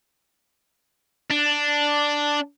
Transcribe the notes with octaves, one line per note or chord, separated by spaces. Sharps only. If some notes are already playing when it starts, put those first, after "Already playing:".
D4